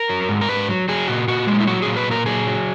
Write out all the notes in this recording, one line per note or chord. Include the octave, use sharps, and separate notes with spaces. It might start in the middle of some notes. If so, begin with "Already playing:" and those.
Already playing: A#4
F#3
G#2
A#4
G#2 B4
F#3
F#3 G#4
A#2 F#4
A#2 F#4
F#3 G#3
E4
F#3 F#4
A#2 G#4
B4
A#2 A#4
F#3 G#4
F#3